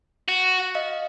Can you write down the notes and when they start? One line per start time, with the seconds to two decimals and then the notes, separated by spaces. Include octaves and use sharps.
0.28 F#4
0.75 D#5 F5